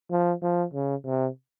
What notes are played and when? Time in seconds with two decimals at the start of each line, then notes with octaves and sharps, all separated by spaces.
0.11 F3
0.42 F3
0.74 C#3
1.05 C3